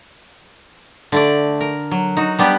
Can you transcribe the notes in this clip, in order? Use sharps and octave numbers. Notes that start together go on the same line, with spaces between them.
D3 A3 D5
A#4
F#3
D#4 F#4
G3 B3 D4 G4